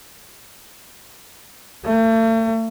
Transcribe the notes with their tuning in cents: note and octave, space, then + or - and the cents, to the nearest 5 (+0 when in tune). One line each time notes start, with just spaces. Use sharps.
A3 +40